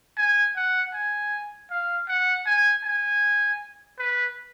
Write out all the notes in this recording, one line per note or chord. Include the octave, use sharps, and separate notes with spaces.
G#5
F#5
G#5
F5
F#5
G#5
G#5
B4